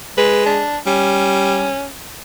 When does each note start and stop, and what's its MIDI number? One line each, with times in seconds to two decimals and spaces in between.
0.18 0.63 56
0.18 0.44 71
0.46 0.78 62
0.86 1.73 55
0.86 1.87 61